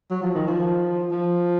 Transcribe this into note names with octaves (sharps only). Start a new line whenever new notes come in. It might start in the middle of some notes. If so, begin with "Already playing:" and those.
F#3
F3
D#3
F3
F3